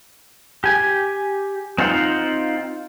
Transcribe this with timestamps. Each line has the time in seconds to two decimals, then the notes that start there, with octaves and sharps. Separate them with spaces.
0.64 G4 G#5
1.78 C4 D#4 F4 C5 F#5